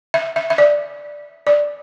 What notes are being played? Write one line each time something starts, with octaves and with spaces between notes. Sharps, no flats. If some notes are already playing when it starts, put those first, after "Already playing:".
E5
E5
E5
D5
D5